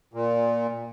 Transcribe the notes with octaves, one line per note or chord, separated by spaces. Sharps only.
A#2